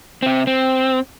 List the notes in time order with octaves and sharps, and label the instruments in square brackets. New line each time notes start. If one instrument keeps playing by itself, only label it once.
[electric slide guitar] C3 C4
C4